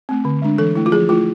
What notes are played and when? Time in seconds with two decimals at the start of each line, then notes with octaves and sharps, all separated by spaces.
0.09 A3 C4
0.25 D3
0.42 G#3 D4
0.58 E3 A4
0.75 A3 E4
0.86 F4
0.92 F3 G#4
1.09 A3 E4 F4